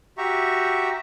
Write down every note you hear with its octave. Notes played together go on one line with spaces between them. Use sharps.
F#4 G4 E5 A#5 C#6